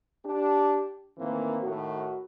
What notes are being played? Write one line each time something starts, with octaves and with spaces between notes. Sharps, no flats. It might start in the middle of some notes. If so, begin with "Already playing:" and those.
D4 G4
A2 D#3 E3 A#3 C4
A2 D#3 F#4